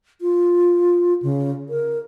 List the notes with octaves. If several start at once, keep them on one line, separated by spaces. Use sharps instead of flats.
F4
C#3
A#4